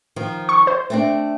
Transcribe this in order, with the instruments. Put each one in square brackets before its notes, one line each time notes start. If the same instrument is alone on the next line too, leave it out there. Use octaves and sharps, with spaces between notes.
[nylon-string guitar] D#3 F3
[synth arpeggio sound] C#6
C5
[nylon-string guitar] A3 C4 D4